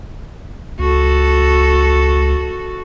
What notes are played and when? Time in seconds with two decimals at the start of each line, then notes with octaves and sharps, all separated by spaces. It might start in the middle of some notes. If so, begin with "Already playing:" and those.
0.79 C#2 F#4 A4